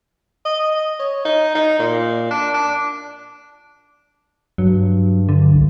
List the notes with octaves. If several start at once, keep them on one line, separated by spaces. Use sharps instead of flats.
D#5
C#5
D#4
D#4
A#2
D4
D4
G2 F#3
D3
C2